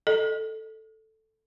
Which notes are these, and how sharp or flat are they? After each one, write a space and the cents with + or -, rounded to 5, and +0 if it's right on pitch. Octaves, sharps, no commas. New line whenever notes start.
A4 +0 D#5 -10